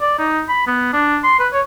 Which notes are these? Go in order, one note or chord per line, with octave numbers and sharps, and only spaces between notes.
D5
D#4
B5
B3
D4
C6
B4
C#5